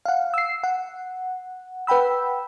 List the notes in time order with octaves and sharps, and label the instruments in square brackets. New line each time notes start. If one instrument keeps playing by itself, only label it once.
[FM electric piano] F5 F#5
E6 C7
F#5
B4 F#5 G5 B5 E6